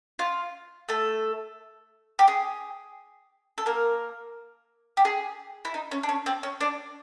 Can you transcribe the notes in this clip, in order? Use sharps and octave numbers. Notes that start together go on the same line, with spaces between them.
F4
A3 A4
G4
G#4
A4
A#3 A#4
G4
G#4
E4
D#4
C#4
D4
C#4
C4
C#4
D4